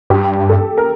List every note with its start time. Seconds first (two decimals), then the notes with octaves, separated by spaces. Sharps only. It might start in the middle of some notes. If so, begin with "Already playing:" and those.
0.10 G2 G4
0.49 A4
0.78 A#4